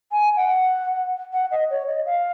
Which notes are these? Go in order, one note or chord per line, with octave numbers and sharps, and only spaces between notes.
G#5
F#5
F#5
D#5
C#5
D#5
F5